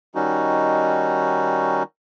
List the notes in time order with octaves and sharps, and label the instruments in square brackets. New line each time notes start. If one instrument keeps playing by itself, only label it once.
[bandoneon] D#3 G3 C#4 D#4 F#4